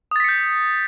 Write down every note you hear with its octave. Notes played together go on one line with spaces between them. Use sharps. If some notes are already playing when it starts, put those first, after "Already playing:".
D#6 G6 A6 B6 C#7